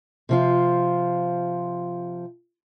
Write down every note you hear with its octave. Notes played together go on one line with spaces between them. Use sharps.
C3 F3 F4